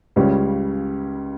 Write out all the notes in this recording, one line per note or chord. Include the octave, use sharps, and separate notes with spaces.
C#2 C#3 G3 C#4